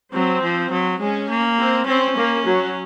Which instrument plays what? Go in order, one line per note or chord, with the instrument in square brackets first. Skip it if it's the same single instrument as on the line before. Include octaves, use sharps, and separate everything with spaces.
[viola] F#3 [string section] C4
[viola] F3
F#3
[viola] G#3 [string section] C#4
[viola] A#3
[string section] C4
[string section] C4 [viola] C#4
[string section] A#3
F#3